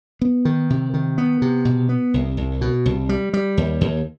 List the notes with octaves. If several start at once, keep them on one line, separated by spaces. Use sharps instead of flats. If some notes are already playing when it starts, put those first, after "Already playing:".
B3
D#3
C3
D#3
B3
C3
B2
B3
C2
C2
B2
C2
G3
G3
D#2
D#2